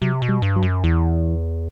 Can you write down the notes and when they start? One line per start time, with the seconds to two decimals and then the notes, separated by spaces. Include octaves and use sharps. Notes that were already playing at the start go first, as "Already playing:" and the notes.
0.01 C3 F#3
0.22 B2
0.29 G3
0.42 G2
0.56 F#3
0.62 F#2
0.84 E2 E3